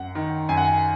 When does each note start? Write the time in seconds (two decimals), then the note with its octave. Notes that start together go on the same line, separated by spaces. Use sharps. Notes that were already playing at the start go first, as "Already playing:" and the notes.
Already playing: F#2 F#5
0.15 D#3
0.49 F#2 G#5
0.57 F#5
0.65 G#5